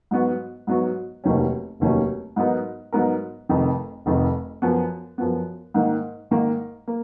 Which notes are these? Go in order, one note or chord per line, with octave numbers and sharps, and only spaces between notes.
G#2 F#3 B3 F#4
G#2 F#3 B3 F#4
F1 D#2 D#3 F#3 C#4
F1 D#2 D#3 F#3 C#4
G#2 F#3 B3 D#4 A#4
G#2 F#3 B3 D#4 A#4
F1 F2 D#3
F1 F2 D#3
F#2 F3 B3
F#2 F3 B3
G#2 D#3 A#3
G#2 D#3 A#3
A#3